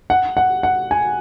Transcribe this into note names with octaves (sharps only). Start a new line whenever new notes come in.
F#5
F#5
F#5
G#5